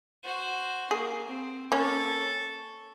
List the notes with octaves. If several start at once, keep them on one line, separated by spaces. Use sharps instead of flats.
F#4 C5
A#3 G#4
C4
A#3 C#4 A4 C#6